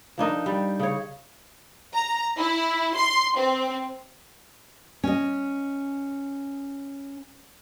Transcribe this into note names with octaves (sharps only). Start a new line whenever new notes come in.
F3 D4 D#4 A#4
G3
C#3 C#5
A#5
E4
C6
C4
C#4 D#5